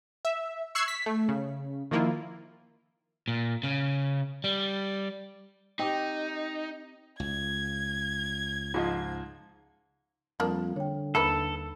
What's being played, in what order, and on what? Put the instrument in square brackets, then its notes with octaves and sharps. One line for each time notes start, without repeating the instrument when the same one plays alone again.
[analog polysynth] E5
C#6 E6 F#6 G#6 C7
B6
A3
C#3
D#3 F3 A#3 E4 F4
[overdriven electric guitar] A#2
C#3
G3
[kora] C4 G4 [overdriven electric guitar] D#4
[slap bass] C#2 [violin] G#6
[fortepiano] G#2 F3 D#5
[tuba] F2 [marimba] G3 D#6 [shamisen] A#3 D4
[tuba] D3 [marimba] C#5 G5
[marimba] D#2 B5 [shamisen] A#3 E4 B4 [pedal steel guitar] A4